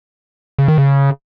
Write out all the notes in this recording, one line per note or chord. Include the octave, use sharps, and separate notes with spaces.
C#3
D#3
C#3